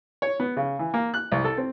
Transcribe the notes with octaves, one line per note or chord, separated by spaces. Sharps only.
C#5
B3
C#3
E3
A#3
F#6
C2
A4
C4